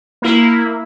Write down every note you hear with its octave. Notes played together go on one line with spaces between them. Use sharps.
A#3 E4